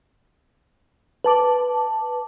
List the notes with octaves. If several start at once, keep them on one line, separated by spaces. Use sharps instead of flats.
B4 A5 D6